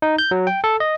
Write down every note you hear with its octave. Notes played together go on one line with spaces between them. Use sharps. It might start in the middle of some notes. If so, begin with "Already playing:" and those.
D#4
G6
F#3
G5
A4
D#5